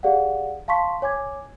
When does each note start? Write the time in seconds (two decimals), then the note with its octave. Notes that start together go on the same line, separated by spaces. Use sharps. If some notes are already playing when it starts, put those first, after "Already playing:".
0.03 G4 G#4 D5 F5 F#5
0.68 F5 A5 C6 C#6 B6
1.02 C#5 G#5 D6 G#6